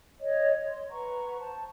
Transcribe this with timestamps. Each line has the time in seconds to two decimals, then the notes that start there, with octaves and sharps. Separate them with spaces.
0.19 C#5 D#5
0.68 C6
0.90 B4 F#5 A#5 C#6
1.39 C5 A5